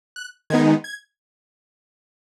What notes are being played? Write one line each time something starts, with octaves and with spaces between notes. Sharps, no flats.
F#6
D#3 G#3 B3 D#4 G#6
G#6